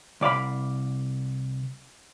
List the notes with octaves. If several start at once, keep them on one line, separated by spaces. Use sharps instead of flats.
C2 D5 F5 B5